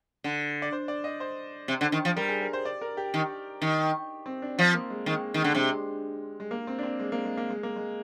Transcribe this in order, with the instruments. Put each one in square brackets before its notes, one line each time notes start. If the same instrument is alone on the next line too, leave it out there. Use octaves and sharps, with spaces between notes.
[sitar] D3
[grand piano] D5
C5
D5
D#5
C5
[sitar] C3
D3
D#3
F3
[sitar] G3 [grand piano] A#4
[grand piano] G#4
A#4
C5
D5
A#4
G4
[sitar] D#3
D#3
[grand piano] C4
D4
[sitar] F3 [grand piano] C4
[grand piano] A#3
G#3
[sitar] D#3 [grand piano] G#3
[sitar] D#3
D3
[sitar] C3 [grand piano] G#3
[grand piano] G#3
A#3
C4
D4
C4
G#3
A#3
G#3
A#3
G#3
A#3
G#3